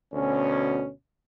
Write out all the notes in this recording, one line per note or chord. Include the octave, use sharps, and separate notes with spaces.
D2 B2 C#4